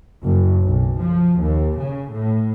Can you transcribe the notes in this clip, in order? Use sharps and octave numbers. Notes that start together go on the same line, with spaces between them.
F#1
B1
F3
D#2
C#3
A2